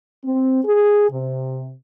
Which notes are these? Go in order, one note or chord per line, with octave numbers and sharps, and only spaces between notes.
C4
G#4
C3